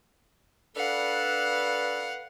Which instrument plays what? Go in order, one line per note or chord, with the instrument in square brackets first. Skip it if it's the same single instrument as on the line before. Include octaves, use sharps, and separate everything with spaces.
[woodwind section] D4 A4 B4 [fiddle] F5 F#5